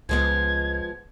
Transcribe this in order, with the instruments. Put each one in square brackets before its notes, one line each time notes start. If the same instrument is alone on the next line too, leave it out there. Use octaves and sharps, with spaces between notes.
[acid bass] C#2 [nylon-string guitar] F3 G#3 B3 [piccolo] G#6